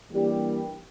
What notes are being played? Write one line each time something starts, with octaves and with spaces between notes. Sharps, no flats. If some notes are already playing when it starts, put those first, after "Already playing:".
E3 G3 A#3 D4 G4